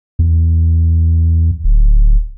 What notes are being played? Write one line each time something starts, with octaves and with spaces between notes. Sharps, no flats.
E2
D1